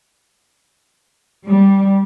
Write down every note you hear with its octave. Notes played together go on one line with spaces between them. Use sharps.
G3